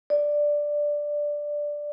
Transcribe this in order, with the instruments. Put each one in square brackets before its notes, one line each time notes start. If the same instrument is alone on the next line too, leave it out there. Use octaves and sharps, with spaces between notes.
[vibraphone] D5